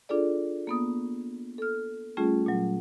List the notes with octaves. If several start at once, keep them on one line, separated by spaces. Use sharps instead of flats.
D4 F4 G#4 A4 D5
A#3 B3 D#6
A4 F6
G3 A3 C#4 F4 G#4
A#2 F#3